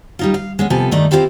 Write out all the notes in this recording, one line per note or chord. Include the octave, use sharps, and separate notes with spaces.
G3 D#4 F4
F5
G#3 B3 C#4
C3 F3 B3 A4 G#5
G2 D#3 A3 D#4 D5
C4 D4 E4 F4 G4 C5